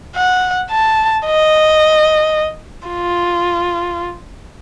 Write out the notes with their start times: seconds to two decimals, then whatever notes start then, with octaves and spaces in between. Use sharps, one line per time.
0.16 F#5
0.71 A5
1.26 D#5
2.88 F4